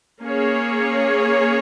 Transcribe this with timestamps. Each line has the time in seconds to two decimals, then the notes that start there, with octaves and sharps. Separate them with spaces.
0.21 A#3 C#4 G#4 C#5